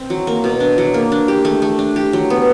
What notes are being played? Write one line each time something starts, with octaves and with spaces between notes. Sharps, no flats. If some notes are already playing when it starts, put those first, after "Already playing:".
Already playing: C4
F#3
A#3
B2
D4
F#3
A#3
D4
G4
A3
A3
D4
G4
F#3
B3